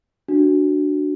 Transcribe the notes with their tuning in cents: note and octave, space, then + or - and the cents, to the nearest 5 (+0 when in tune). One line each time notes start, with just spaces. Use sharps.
D4 +5 F#4 +5